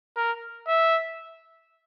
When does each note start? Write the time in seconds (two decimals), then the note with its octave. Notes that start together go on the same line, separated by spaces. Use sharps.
0.17 A#4
0.67 E5